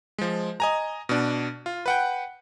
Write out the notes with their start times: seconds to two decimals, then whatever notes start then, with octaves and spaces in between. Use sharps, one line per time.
0.18 F3 G#3
0.60 D#5 G#5 A#5
1.09 B2 D4
1.66 F4
1.86 B4 F#5 G5